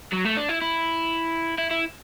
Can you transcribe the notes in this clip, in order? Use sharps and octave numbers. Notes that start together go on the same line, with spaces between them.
F#3
A3
D4
E4
E4
E4
E4